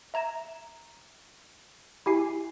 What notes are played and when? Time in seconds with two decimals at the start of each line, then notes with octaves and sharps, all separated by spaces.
0.14 E5 A#5 G#6 E7
2.06 E4 G4 G#5 C7